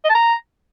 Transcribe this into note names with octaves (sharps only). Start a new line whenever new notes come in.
D#5
A5
A#5